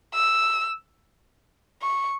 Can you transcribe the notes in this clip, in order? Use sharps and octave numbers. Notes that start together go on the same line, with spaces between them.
E6
C#6